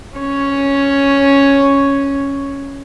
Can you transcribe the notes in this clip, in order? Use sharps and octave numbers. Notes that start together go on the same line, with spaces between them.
C#4 C#5